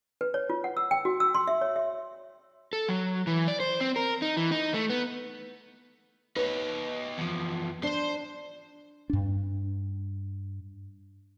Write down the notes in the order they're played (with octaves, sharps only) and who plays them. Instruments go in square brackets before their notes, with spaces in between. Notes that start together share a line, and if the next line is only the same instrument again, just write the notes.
[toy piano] B4
C#5
F4
F#5
E6
G5
F#4
E6
C6
E5
C#5
E5
[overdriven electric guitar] A4
F#3
E3
D5
C5
C4
A#4
D#4
E3
D#4
A3
B3
[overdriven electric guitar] D#4 C#5 [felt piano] B4
[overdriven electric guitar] E2 F3
[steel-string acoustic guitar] D4 [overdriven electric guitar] C5 C6
[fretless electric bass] G2 D4